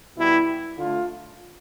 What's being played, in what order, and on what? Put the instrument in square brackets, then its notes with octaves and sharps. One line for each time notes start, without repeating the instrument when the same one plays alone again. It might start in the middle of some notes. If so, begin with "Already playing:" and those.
[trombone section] B2 G3 B3 E4
D3 A3 F4